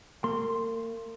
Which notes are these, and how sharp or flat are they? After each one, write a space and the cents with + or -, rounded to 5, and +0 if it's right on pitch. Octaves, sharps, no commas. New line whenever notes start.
A#3 -40 C6 +0